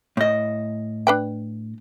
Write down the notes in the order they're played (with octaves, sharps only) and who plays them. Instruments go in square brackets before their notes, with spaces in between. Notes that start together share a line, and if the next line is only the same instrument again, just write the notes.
[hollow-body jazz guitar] A2 D#5
[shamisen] D4 B4 G5